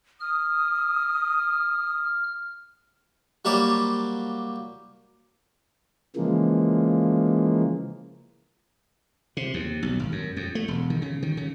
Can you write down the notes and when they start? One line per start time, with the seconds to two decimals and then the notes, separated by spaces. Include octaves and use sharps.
0.21 D#6 F6
3.45 F#3 G3 A#3 G4 C5 D5
6.16 C#3 E3 F3 G#3 A#3
9.37 C3
9.54 D#2
9.83 B1
9.99 G#1
10.12 F#2
10.36 F2
10.55 A3
10.68 E1
10.90 D#3
11.02 C#3
11.23 D#3
11.37 C#3